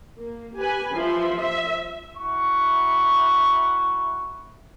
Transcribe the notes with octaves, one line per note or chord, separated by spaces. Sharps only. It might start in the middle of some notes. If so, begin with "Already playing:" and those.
A#3
G4 B4 G#5
F3 G3 E5 C6
E5
E4 F#4 C#6